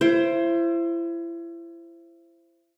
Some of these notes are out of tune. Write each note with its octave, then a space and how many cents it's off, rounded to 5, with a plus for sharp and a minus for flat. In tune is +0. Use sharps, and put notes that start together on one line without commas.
E4 +35 C5 +10